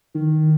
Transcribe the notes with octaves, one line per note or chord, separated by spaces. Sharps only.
D#3